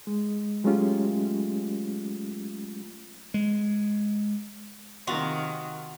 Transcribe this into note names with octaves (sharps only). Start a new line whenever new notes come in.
G#3
F#3 G#3 A3 C#4 F4 G4
G#3
C3 D#3 F4 F#4